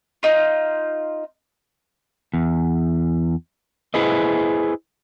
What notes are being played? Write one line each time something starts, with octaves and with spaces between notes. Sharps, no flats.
D#4 F4
E2
E4 G#4 B4 C5 D#5